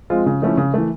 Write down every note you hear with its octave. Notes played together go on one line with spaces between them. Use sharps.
F3 G#3 C4 F4
C#3
F3 A3 C#4 E4
C#3
E3 A3